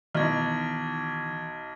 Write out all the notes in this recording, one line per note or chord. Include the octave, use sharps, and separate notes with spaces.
B1 D#3 E3 F6 G#6